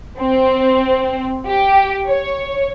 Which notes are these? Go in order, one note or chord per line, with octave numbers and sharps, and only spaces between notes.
C4
G4
C#5